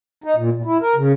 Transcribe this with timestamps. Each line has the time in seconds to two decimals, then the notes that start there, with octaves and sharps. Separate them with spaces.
0.24 D#4
0.37 A#2
0.53 A#2
0.65 E4
0.82 A#4
0.96 C#3